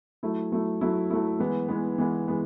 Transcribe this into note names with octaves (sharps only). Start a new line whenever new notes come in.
F#3 A3 E4
F#3 A3 E4
F#3 A3 E4
F#3 A3 E4
E3 G#3 B3
E3 G#3 B3
E3 G#3 B3
E3 G#3 B3